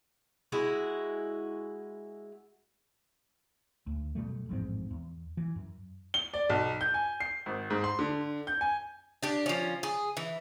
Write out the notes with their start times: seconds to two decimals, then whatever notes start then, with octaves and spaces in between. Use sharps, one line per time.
0.52 G#3 E4 F#4
3.87 D2
4.15 F#2 B2 G3 A3
4.49 A1 F2 G#2 C4
4.91 E2
5.37 E3
5.56 F#2
6.14 G7
6.34 D5
6.50 B1
6.81 G6
6.94 G#5
7.20 C7
7.46 G#1
7.70 G#2
7.84 C6
7.99 D3
8.47 G6
8.61 G#5
9.23 D4 G4
9.46 F3 C#4
9.83 G#4
10.17 E3